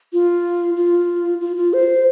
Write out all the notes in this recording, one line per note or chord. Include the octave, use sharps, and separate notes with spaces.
F4
F4
F4
F4
C5